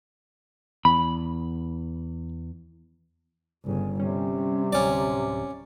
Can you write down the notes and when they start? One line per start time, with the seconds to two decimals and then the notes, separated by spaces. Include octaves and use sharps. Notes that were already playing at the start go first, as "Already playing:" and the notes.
0.85 E2 B5
3.65 G1 C#3
4.00 C3 G3 C#4
4.72 D1 C#4 D5